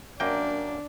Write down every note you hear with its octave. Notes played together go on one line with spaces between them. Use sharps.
F#2 A#3 D4 G5